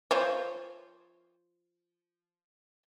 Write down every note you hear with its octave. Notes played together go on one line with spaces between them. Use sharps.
F3 C5 C#5